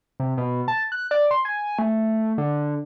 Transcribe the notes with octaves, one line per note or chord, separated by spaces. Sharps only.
C3
B2
A5
F#6
D5
C6
G#5
A3
D3